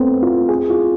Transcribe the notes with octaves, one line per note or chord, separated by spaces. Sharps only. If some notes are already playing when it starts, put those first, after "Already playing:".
Already playing: A3 B3 C4
F4
G#4
F4